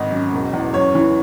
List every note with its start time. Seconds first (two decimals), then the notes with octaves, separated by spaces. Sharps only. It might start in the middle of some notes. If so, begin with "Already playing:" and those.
Already playing: G#1 D#5
0.10 F#2
0.32 E1
0.53 E2
0.74 F#2 C#5
0.95 E3